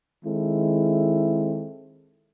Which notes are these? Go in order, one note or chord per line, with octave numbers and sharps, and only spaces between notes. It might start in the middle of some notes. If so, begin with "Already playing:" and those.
D#3 G#3 C4 E4 A4